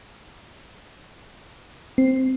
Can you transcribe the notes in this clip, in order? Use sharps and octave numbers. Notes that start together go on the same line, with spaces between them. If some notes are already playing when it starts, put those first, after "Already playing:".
C4